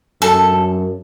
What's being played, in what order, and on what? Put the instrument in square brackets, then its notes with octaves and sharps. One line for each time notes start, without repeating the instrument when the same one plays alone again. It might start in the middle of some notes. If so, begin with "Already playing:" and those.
[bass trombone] F#2 [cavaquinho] A4